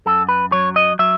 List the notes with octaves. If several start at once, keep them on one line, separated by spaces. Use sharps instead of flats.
F#2 A4
B4
F#3 C#5
D#5
F#3 E5